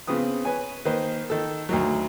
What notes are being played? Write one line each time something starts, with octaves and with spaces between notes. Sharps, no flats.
C#3 B3 C4 B4 D#6
B4 C#5 G#5
D#3 A#3 B4 C5
D#3 A4
D2 D#3 F#3